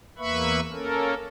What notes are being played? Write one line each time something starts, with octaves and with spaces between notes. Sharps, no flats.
E2 A#3 B4 E5 B5 C#6
A#3 C#4 A4 A#4